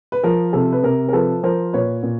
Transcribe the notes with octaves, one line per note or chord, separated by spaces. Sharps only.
B4
F3 A#4
C3 A4
B4
C3 A#4
A#4
F3 A4 B4
F3 A#4 C5
A#2 B4 C#5
A#2